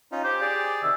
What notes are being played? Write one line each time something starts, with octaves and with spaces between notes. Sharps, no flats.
C#4 D#4 F4
G4 C5
G#4 D5
C3 D#3 E5